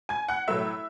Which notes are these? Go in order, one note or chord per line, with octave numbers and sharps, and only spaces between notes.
G#5 G#6
F#5 F#6
A2 F#3 A3 E5 E6